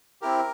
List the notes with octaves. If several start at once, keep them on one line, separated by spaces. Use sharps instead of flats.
C4 E4 G4 A#4